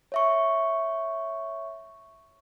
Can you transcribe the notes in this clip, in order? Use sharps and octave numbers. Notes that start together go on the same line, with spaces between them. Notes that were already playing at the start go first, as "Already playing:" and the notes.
C#5 E5 C#6